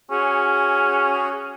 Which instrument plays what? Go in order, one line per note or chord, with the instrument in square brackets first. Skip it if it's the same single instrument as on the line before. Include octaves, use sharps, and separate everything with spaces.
[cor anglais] C#4 [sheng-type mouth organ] F#4 G#4